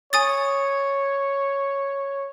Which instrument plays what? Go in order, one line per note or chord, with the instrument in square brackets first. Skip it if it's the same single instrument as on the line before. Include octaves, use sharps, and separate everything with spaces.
[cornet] C#5 [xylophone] G#5 D#6 A6